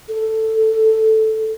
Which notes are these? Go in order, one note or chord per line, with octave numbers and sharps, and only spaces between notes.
A4